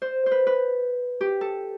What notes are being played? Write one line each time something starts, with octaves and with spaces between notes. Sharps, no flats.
C5
C5
B4
B4
G4
A4